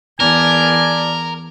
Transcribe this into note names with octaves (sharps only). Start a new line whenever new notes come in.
E2 A#4 D5 G#5 A5